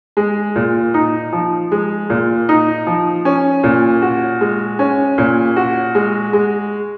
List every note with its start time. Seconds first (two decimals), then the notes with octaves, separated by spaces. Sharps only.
0.17 G#3
0.56 A#2
0.94 D#4
1.32 F3
1.72 G#3
2.10 A#2
2.49 D#4
2.87 F3
3.25 C#4
3.63 A#2
4.02 F#4
4.41 G#3
4.79 C#4
5.18 A#2
5.56 F#4
5.95 G#3
6.33 G#3